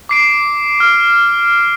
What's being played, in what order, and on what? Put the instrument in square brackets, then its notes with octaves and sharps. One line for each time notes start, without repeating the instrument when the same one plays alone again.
[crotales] D6 C7 D7
F6